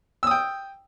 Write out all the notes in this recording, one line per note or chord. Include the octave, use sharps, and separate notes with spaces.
G5 D#6 E6